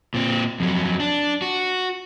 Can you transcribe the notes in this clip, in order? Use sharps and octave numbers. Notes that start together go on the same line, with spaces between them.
A#2 C4
F2 F#3
D4
F#4